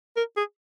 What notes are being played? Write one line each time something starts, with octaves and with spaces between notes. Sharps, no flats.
A#4
G#4